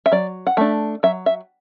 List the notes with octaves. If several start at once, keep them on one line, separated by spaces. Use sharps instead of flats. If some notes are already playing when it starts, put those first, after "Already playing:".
E5
F#3 D5
F#5
A3 D4 E5
F#3 E5
E5